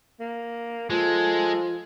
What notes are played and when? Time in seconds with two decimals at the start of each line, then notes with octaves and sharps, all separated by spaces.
0.20 A#3
0.90 F3 G#3 F4 A4